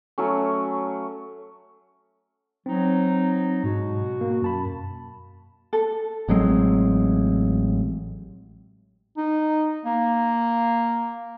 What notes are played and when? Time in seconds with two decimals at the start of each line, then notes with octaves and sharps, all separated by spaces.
0.18 F#3 A3 C#4
2.66 F#3 C4 D#4
3.63 G#2 B2 F#4
4.21 A#3
4.42 F#2 A5 B5
5.73 A4
6.29 A1 F#3 G#3 C4
9.17 D#4
9.85 A#3